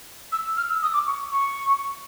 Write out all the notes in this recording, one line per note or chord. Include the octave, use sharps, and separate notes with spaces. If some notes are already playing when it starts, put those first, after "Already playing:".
E6
F6
E6
D#6
D6
C#6
C#6